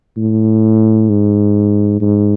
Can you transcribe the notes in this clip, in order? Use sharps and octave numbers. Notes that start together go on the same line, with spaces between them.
A2
G#2
G#2